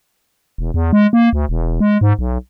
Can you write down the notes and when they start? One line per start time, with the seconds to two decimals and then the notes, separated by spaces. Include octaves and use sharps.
0.58 E1
0.74 E2
0.93 G#3
1.13 A#3
1.33 D2
1.49 E1
1.80 G#3
2.01 G#2
2.19 B1